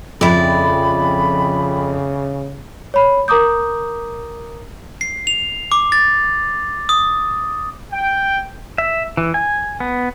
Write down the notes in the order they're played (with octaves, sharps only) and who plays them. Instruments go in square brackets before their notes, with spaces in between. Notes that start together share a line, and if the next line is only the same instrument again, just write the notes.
[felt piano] F2 [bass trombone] C#3 [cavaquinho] E4 D5 [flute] B5
[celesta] C#5 B5
A#4 A#5 D6 D#6 G6
[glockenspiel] C7
F7
D6
A6
D#6
[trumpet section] G5
[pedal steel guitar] E5
E3
G#5
B3